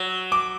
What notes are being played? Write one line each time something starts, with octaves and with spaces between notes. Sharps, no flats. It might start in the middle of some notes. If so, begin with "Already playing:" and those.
Already playing: F#3
D6